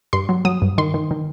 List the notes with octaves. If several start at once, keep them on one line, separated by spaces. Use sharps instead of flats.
G2 C6
F#3
F#3 D#6
G2
D#3 C6
D#3
D#3